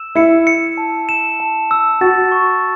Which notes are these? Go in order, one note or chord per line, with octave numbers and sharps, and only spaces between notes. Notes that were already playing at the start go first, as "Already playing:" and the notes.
Already playing: E6 E7
E4 C#7
C#7
A5
E7
A5
E6
F#4 A6
C#6